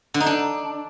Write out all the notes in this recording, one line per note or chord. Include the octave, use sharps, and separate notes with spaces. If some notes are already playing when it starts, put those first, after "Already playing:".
D3
D#4
D4